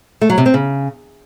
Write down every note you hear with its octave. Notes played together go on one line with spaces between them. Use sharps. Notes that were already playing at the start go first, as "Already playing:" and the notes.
A3
F#3
C3
C4
C#3